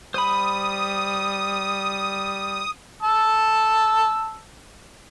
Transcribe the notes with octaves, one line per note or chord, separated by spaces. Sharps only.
G3 C5 B5 D#6
A5 E6